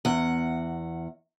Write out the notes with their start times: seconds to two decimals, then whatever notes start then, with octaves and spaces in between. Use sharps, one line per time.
0.05 E2 F#5